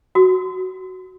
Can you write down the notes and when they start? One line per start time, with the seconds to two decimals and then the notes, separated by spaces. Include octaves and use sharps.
0.15 F#4